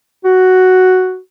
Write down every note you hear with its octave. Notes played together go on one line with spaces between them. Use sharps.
F#4